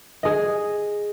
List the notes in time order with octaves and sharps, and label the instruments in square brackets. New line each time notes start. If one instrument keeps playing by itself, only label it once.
[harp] G#4 D#5